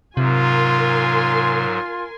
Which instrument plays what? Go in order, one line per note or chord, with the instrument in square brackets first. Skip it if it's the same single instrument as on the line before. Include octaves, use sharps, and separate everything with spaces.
[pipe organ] G#2 F#3 [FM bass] C3 [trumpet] F4 [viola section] A#4 G#5 C6